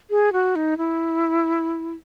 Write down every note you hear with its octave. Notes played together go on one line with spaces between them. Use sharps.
G#4
F#4
D#4
E4